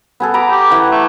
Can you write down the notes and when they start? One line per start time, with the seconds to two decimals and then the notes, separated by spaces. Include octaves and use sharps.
0.20 B3 G#4 A4
0.34 A#5 B5 D6
0.50 G4
0.71 E3 F#5
0.91 A3